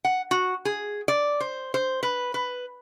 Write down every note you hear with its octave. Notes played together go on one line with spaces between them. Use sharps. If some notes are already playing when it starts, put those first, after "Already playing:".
F#5
F#4
G#4
D5
C5
C5
B4
B4